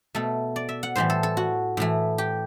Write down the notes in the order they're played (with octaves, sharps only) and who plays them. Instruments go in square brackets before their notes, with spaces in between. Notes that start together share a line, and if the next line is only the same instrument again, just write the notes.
[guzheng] B2 A3 A4
D5
E5
F#5
A2 E3 G3 C5
A4
A4
F#4
A2 E3 A3
G4